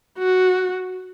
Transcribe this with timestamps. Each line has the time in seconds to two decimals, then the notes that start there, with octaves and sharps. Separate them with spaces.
0.18 F#4